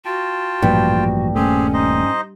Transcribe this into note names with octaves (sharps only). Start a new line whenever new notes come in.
F4 F#4 G5 A5
A1 G2 A#2 F3
D#1 A#2 A3 C4 C#4 G4 G#4
D#4 C5 D#5